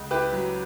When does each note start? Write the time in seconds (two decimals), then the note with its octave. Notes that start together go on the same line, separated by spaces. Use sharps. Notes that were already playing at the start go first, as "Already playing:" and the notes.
Already playing: C#2
0.11 E4 G4 B4
0.33 F#3